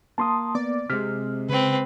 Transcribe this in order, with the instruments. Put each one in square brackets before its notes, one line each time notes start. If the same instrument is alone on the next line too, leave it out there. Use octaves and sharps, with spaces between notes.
[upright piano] A#3 [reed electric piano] A5 C6 D#6
[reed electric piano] B3 [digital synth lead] D5
[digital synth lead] C3 [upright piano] G#3 B6 [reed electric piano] F6
[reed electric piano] C#3 [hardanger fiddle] C4 B4